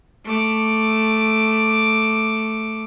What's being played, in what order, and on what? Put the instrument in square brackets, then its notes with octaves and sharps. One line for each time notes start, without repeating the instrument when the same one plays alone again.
[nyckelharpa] A3 D6